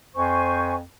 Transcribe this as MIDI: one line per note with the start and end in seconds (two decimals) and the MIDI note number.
0.15 0.83 41
0.15 0.74 72
0.15 0.74 80
0.15 0.74 85